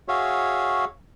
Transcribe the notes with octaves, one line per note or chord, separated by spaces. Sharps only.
F#4 G#4 C#5 E5 F5